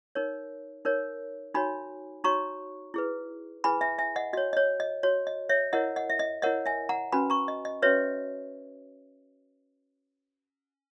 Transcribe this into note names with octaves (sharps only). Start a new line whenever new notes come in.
D#4 A#4 C#5
D#4 A#4 C#5
D#4 F#4 C#5 G#5 B5
D#4 F#4 C#5 A#5 C#6
E4 G#4 B4
E4 G#4 B4 G#5 B5
E5 G#5
E5 G#5
D#5 F#5
F#4 C#5 D#5
D#5
C#5
D#5
F#4 C#5
D#5
C#5 E5
E4 A#4 C#5 D#5 F#5
D#5 F#5
E5
D#5
E4 A#4 C#5 D#5 F#5
E5 G#5
F#5 A#5
C#4 F#4 B4 G#5 B5
A#5 C#6
D#5
D#5
C#4 F#4 B4 C#5 E5